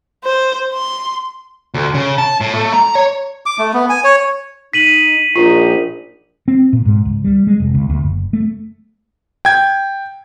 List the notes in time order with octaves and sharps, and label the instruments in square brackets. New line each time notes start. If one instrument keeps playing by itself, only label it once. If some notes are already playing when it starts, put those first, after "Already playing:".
[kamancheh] C5
C6
[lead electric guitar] D2
C#3
A5
A2
A3
A#5
C#5
[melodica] D6
A3
B3
G#5
C#5
[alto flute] D#4 [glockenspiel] B6 D#7 F#7
[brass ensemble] A#1 D#4 [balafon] F4 [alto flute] A#4
[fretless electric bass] C4
A#2
G#2
C#2
G3
G#3
F1
C#2
D2
F#1
A3
[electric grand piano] G5 G#6